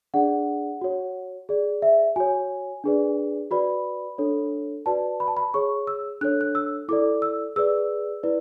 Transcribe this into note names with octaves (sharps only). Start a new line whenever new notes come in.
D4 G#4 D5 F#5
F#4 C#5
G#4 D5
E5
F#4 C#5 G#5
D4 G#4 B4 D5
F#4 B4 D5 B5
D4 A4 C#5
F#4 B4 D5 A5
B5
A5
B5
G#4 C#5 C#6
E6
D4 A4 C#5 F#6
F#6
E6
E4 A4 D5 D6
E6
G#4 B4 D5 E6
E4 B4 D5